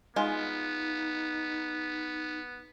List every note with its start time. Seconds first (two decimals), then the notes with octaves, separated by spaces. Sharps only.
0.16 G#3 B3 D#4 F4